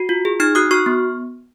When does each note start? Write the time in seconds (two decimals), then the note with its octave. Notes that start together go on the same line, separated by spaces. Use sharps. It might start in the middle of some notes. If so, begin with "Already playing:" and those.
Already playing: F#4
0.09 F4
0.25 G#4
0.40 D#4 F6 G#6
0.55 F#4 D#6 F#6
0.71 F#4 C#6 F6
0.86 B3